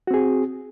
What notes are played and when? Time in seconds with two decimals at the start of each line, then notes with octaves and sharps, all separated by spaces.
0.07 F#4
0.11 C4
0.14 G#4